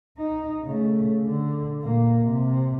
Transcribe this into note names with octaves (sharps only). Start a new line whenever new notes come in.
D#4
C#3 A3
D3
A#2 A#3
C3